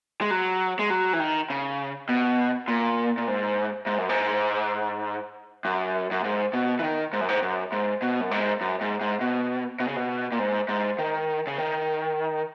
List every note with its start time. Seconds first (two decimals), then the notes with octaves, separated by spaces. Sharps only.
0.21 G#3
0.31 F#3
0.79 G#3
0.90 F#3
1.13 E3
1.20 D#3
1.50 C#3
2.09 B2
2.68 A#2
3.18 A#2
3.28 G#2
3.87 G#2
3.98 F#2
4.09 G#2
5.65 F#2
6.11 F#2
6.24 G#2
6.53 B2
6.79 E3
6.83 D#3
7.13 G#2
7.21 F#2
7.29 G#2
7.42 F#2
7.72 G#2
8.02 B2
8.21 F#2
8.31 G#2
8.61 F#2
8.81 G#2
9.01 G#2
9.21 B2
9.80 B2
9.88 C#3
9.96 B2
10.32 A#2
10.39 G#2
10.69 G#2
10.99 D#3
11.47 C#3
11.58 D#3